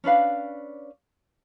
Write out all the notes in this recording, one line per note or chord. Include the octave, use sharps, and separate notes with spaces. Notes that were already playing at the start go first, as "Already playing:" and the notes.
C#4 D4 B4 F5